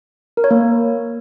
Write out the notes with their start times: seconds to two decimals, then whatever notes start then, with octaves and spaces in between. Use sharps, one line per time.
0.37 A#4
0.44 C#5
0.51 A#3